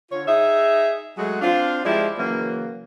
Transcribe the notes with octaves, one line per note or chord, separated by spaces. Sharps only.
D3 F4 C#5
D#4 G#4 E5
F#3 G#3 A3 F#4 G#4
C4 D4 F4
F3 G#3 E4 G4 D5
C#3 E3 F#3 A#3